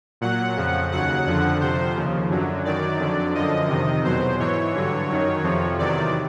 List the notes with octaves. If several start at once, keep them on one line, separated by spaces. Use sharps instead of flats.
A#2 F#3 F#5
F2 C#3 F3
D#2 C#3 F#3 F#5
F2 D3 F3
F2 C3 F3 C5
D#2 C#3 F3
F#2 D3 F#3
F#2 D#3 F#3 D5
F2 D3 F#3
F#2 D3 F3 D#5
F2 C3 D#3
E2 B2 F#3 C5
G#2 E3 C#5
G2 D3 F#3
F#2 D#3 F#3
F2 C3 F3
E2 C3 D#3 F#3 D5